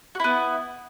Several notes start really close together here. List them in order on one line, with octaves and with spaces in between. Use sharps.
F#4 E4 B3